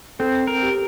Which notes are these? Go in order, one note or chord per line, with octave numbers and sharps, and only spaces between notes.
C4 A4
A#4
G4